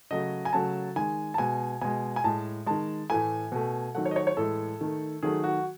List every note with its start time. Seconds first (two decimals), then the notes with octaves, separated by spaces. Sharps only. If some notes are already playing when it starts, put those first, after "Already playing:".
0.11 C#3 F#3 A3 D#5
0.45 G#5
0.53 C#3 F#3 A3 A5
0.96 D#3 G#3 G#5
1.34 A5
1.38 B2 G#3 G#5
1.81 B2 G#3 G#5
2.16 G#5
2.24 A2 G#3 A5
2.66 D#3 G#3 A5
3.10 A2 E3 A3 G#5
3.52 B2 A3
3.95 D#3 F#3 A3 F#5
4.05 C#5
4.11 D#5
4.16 C#5
4.27 C#5
4.37 A2 E3 G#3 A4
4.81 D#3 A3
5.23 D#3 F#3 A3 G#4
5.44 F#4